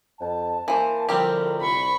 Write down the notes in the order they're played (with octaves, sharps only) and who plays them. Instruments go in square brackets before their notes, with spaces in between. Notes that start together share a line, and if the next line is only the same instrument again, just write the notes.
[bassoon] F2 [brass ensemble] A5
[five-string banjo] E3 C5 [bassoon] A#3
[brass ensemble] A2 D3 F3 [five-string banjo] G3 C4 G4 [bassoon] A#4
[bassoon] C2 [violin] B5 C#6